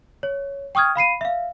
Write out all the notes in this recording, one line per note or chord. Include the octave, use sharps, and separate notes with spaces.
C#5
G5 C#6 D#6 F6 G#6
F5 B5 C7 D#7
E5 F5